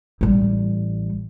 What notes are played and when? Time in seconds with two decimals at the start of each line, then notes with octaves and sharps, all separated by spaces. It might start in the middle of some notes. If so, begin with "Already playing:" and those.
0.21 A1 G3